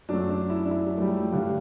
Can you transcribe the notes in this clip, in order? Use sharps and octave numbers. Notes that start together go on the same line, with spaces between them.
F#2 F#3 A3 D4
D4
E4
D4
E4
F#3
A3
G3
G3
G2 D3 G3 A3 D4